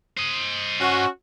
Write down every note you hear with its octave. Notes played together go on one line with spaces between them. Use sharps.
C5 D#5
C#4 F#4